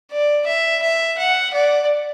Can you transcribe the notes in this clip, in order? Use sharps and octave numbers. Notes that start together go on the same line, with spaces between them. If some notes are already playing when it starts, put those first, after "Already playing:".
D5
E5
E5
F#5
D5